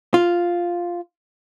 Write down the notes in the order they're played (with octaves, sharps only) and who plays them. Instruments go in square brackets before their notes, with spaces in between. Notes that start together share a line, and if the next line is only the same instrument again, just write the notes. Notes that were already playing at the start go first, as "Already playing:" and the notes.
[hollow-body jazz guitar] F4